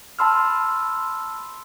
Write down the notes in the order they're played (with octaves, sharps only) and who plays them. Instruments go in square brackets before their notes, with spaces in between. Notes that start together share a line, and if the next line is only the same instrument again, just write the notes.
[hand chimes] A5 B5 C6 E6 F6